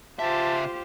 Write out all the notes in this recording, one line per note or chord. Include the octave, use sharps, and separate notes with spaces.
C#3 F4 G4 C5 E5 A5